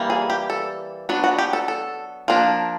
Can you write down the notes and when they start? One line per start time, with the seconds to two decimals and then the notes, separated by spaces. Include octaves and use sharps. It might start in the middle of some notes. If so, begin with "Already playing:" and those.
Already playing: E3 G3 A#3
0.10 G#4
0.30 G4
0.50 A4
1.09 F#3 B3 D4
1.24 F#4
1.39 G4
1.53 A4
1.68 A4
2.28 F3 A#3 D4